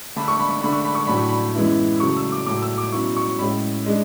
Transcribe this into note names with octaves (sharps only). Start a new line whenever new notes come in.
D3 A3 D4 B5
C#6
B5
C#6
D3 A3 D4 B5
C#6
B5
C#6
A2 F#3 A3 D4 B5
C#6
B5
F#2 E3 G#3 B3 E4
C#3 F#3 A3 C#6
E6
D6
A2 F#3 A3 D6
E6
D6
B2 F#3 C#4 E4 C#6
C#6
A2 G#3 C#4 B5
G#3 D4